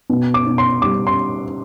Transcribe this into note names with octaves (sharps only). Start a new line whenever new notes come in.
B2
D6
B2
C6
G3 D6
C6